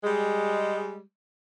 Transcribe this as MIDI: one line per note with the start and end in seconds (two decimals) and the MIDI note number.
0.04 1.01 55
0.04 1.01 56